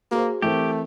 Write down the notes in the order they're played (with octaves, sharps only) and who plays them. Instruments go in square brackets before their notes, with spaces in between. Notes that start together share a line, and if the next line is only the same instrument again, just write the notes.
[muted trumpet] A#3 [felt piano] F#4 G#4 C5
[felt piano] E3 C4 A#4 [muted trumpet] A3 [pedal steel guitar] G4